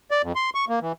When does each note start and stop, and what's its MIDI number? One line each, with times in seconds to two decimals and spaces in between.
0.11 0.22 74
0.23 0.32 41
0.36 0.50 84
0.55 0.65 85
0.69 0.79 58
0.81 0.92 52